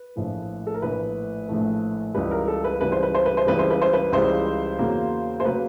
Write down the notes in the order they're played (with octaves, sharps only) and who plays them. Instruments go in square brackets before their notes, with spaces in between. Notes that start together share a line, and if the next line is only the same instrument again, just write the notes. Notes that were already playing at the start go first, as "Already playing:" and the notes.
Already playing: [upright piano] B4
A#1 A2 F3 A3
A4
A#4
A#1 A2 F3 A3 B4
A#1 A2 F3 A3
C#2 C#3 E3 G3 B4
A#4
A4
B4
C#2 C#3 E3 G3 B4
C5
B4
C5
B4
C5
C#2 C#3 E3 G3 B4
C5
B4
C5
B4
C#2 C#3 E3 G3 C5
E2 C#3 F#3 A#3
C5
C#3 F#3 A#3 B4